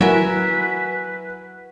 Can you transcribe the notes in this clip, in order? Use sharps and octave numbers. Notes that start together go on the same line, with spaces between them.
F#3 E4 F#4 A#4 B4 E5 G#5